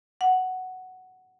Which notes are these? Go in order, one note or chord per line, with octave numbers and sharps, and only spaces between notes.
F#5